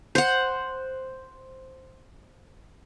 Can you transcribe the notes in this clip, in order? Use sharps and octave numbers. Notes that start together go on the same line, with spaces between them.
C5 F#5